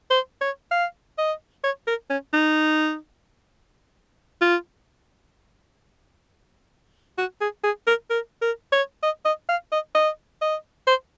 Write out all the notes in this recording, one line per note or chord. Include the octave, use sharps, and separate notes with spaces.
C5
C#5
F5
D#5
C#5
A#4
C#4
D#4
F4
F#4
G#4
G#4
A#4
A#4
A#4
C#5
D#5
D#5
F5
D#5
D#5
D#5
C5